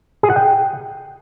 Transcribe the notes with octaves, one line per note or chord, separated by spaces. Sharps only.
G#4
F#5
G5